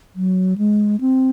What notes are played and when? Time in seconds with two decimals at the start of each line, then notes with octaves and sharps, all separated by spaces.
0.16 F#3
0.58 G#3
1.01 C4